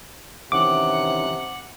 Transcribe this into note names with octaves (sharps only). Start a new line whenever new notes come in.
C3 D#3 E3 C#4 F#5 D6